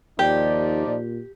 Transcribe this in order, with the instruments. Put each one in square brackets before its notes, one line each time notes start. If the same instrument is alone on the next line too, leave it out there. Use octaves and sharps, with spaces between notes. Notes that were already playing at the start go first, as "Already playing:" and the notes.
[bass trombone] D#2 [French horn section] F3 D#4 D5 [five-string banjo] G4
[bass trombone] A#2